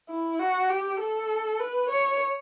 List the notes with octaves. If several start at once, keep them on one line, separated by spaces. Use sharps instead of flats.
E4
F#4
G4
A4
B4
C#5